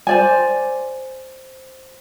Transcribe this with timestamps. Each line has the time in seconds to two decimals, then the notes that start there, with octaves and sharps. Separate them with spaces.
0.07 C5 D5 G#5